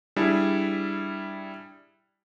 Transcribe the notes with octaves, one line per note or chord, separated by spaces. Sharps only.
G3 D4 E4 G#4